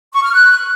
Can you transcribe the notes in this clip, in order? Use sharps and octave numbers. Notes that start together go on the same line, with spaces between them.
C#6
F6
F#6